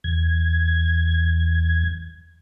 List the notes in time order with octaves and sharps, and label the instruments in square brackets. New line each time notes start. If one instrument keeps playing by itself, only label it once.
[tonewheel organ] E2 G#6